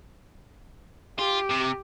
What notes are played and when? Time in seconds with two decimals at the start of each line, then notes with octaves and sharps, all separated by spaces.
1.19 F4 G4
1.51 C3